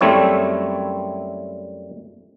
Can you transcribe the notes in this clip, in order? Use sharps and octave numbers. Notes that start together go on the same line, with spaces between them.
F#2 G3 A3 C4 E4 C#5